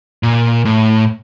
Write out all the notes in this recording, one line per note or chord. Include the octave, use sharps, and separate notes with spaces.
A#2
A2